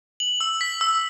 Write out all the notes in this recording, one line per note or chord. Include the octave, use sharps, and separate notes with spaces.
F#7
E6
B6
E6